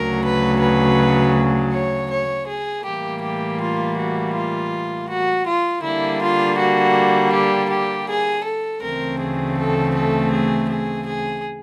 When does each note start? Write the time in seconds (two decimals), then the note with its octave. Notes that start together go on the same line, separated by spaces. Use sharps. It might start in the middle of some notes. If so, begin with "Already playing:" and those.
Already playing: D2 C#3 F#3 A#4
0.24 B4
0.61 B4
1.73 C#5
2.10 C#5
2.47 G#4
2.85 A2 E3 G3 A#3 G4
3.22 G4
3.60 F4
3.97 F#4
4.34 F4
5.09 F#4
5.46 F4
5.83 D3 G3 A#3 E4
6.21 F4
6.58 F#4
7.33 G4
7.70 G4
8.08 G#4
8.45 A4
8.82 D2 C#3 E3 A3 C4 A#4
9.20 G#4
9.58 A4
9.95 A4
10.32 G#4
10.69 G#4
11.06 G#4